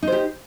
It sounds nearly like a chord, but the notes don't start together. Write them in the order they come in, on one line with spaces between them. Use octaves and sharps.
D#4 C5 G4